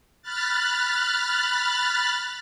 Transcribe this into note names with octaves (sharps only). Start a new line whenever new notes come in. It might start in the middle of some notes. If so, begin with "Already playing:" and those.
B5 F6 F#6 A6